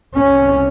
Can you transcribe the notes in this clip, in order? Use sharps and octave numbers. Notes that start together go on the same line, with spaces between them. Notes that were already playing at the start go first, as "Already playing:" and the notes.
C2 C3 C#4